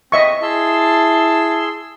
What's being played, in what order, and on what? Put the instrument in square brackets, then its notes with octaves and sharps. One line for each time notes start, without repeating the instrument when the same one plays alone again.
[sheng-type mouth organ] C4 [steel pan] D#5 E5 C#6
[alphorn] E4 [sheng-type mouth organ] G#4 C6 E6 [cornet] A5